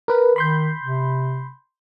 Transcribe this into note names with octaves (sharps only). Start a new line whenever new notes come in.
A#4 B4
D#3 B5 C6 G6
C3